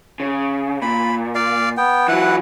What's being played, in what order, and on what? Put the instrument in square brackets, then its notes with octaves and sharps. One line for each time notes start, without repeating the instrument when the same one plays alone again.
[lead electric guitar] C#3
[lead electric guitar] A#2 [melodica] B5
[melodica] D5 F5
B3 G5
[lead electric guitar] E3 F#3 [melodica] E4 B4 F#5